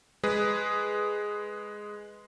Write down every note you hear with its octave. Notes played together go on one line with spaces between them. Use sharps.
G#3 G#4 B4